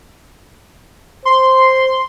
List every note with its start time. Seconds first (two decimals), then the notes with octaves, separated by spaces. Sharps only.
1.25 C5 C6